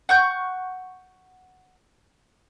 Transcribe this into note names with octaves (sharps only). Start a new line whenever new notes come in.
F#5 C#6 G6